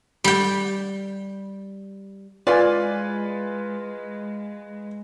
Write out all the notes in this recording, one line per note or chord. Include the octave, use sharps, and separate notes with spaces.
G3 G5
E3 G#3 F4 B4 D5 G#5